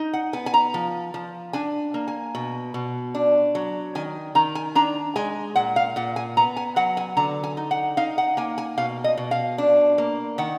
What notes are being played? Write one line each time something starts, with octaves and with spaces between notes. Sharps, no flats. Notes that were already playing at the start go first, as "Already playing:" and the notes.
Already playing: D#4
F#5
B3 G#5
G#5
A#5
F3
F3
D4 G#5
A#3
G#5
B2
B2
D4
F#3
D#3 G#5
D#3 A#5
G#5
D4 A#5
G#3 G#5
A#2 F#5
F5
A#2 F#5
G#5
B3 A#5
G#5
F#3 F#5
G#5
D3 A#5
G#5
D#4
F#5
D#4 F5
F#5
A#3 G#5
G#5
B2 F5
D#5
B2
F5
D4
A#3
D#3 F#5